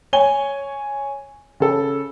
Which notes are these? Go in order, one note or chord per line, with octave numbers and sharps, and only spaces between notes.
C#5 G#5 G7
C#3 A4